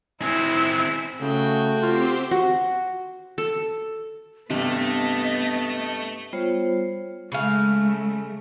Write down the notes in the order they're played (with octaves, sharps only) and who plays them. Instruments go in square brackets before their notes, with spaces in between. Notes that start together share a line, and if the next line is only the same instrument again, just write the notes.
[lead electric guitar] C4 G#4 [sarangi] E4
[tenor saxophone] C#3 [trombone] A3 [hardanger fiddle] F#4 G5
[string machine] C4 G4 C5 [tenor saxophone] F4
[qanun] F#4
A4
[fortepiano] G2 C3 [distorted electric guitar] A3 A4 [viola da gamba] B3 [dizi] D#5
[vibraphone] G3 B3 F4 C5 C#5
[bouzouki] C#3 F5 [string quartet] G#3 A3